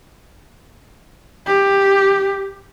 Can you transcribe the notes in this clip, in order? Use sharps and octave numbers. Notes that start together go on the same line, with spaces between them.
G4